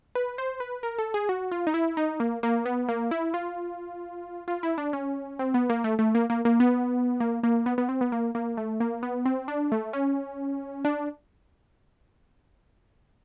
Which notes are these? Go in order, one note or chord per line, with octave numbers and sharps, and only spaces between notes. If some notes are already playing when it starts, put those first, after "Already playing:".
B4
C5
B4
A#4
A4
G#4
F#4
F4
D#4
E4
D#4
A#3
A#3
B3
A#3
E4
F4
F4
E4
D4
C#4
C4
B3
A#3
A3
A3
A#3
A#3
A#3
B3
A#3
A#3
B3
B3
C4
B3
A#3
A#3
A3
A#3
B3
C4
D4
A3
C#4
D4